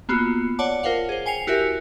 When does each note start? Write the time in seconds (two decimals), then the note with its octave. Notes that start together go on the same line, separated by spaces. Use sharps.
0.09 A#3 B3 F4 F#4
0.59 C#5 D5 F#5 A5 D6
0.83 F4 A#4 C5 C#5 F5 F#5
1.09 G#4 C5
1.26 G5 G#5 C7 C#7 F7
1.47 E4 F#4 G4 A#4 E5